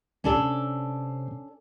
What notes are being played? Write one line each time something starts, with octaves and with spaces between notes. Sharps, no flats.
D2 C#3 C#4 D4 A4
C3